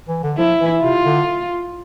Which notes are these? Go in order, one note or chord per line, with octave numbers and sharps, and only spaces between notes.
E3
D3
F3 E4
E3
C3 F4
D3